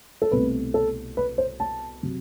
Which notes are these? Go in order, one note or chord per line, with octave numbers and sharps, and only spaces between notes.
A4
C2 B2 A3 C4 B4
A4
B4
C5
A5
C3 F#3